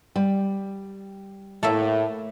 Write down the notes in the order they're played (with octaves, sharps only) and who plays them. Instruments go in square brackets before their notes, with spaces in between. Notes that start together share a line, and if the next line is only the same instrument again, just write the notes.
[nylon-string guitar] G3
[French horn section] A2 [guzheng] A3 A#3 E5